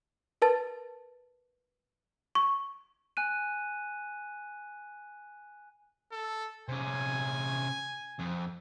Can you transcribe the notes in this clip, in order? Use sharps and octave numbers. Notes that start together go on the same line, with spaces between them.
A#4 B4 A5 A6
C#6
G#5 F#6 D#7
A4
C3 C#4 G#5
F2